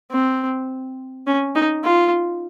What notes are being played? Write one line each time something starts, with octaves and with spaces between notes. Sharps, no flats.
C4
C#4
D#4
F4